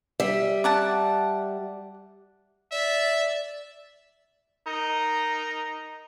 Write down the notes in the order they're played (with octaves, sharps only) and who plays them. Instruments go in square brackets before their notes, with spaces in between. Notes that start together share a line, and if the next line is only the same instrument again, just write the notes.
[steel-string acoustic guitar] G3 E5
[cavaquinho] D5 F#5 A5
[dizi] D5 [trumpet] E5
[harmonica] D#4 A#4